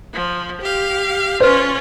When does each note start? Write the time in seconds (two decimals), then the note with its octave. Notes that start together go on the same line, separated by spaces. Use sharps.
0.13 F3
0.61 G4 F5
1.40 C#4 F4 B4 C5 F6